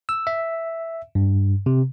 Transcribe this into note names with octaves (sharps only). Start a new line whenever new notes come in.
E6
E5
G2
C3